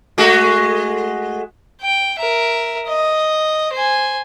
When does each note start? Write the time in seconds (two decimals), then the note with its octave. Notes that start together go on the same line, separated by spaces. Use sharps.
0.18 G#3 A3 F#4
1.81 G5
2.19 A#4 E5
2.86 D#5
3.73 C5 G#5